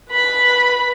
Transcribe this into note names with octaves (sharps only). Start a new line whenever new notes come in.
B4 B5